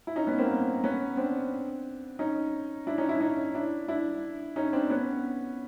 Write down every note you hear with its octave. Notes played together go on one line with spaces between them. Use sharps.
E4
C#4 D#4
B3 C#4
A#3 C4
B3 C#4
C4 D4
C#4 D#4
D4 E4
C#4 D#4
D4 E4
C#4 D#4
D4 E4
D4 E4
C#4 D#4
C4 D4
B3 C#4